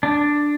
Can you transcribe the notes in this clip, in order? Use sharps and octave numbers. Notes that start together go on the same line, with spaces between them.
D4